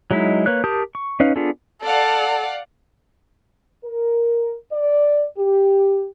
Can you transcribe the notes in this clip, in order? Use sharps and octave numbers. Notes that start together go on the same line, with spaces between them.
F#3 G#3 D#4 E4
A#3 B4 C#5 F#6
G4 A#4 A5 D#6 G6
C#6
C#4 D#4 B4 F5
B3 D4 F4 G#4 A4
A4 D5 F5 F#5
A#4
D5
G4